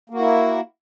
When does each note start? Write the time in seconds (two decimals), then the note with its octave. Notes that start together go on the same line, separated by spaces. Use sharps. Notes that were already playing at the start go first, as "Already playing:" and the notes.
0.10 A#3
0.14 F#4
0.19 E4